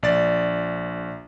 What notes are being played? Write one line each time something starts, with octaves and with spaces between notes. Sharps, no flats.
A#1 D5 A6